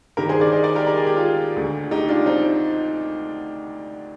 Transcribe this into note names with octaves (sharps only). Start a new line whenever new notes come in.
G2 D#3 G4 A#4
G#4 C5
A#4 D5
C5 D#5
A#4 D5
G4 A#4
A#4
G#4
G4
F4 G#4
D2 D3
D#4 G4
D4 F4
C4 D#4